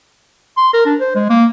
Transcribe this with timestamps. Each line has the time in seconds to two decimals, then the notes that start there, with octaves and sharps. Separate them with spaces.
0.58 C6
0.74 A#4
0.86 D4
1.00 C5
1.15 G#3
1.30 A#3